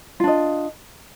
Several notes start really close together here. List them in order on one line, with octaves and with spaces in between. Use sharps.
F4 D4 D#5